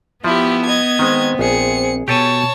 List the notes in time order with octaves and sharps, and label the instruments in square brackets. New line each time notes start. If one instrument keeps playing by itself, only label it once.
[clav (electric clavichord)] F3 [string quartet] B3 [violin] E4 G4
[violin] D#5 G#6
[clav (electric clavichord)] D#3 G#3 [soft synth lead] C4
[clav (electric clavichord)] A#1 [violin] G#4 C#7
[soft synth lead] B2 [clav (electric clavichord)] G4 A4 G#5 [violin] C#5 A5